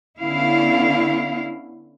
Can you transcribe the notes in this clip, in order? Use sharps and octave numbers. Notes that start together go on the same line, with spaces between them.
D3 B3 C#4 E4 F5